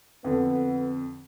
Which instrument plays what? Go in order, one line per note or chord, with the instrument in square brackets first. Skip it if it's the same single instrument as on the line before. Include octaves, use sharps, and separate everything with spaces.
[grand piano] F2 D3 [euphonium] B3